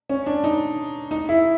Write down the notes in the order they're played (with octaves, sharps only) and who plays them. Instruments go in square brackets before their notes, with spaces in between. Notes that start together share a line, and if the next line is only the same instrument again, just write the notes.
[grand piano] C#4
D4
D#4
D#4
E4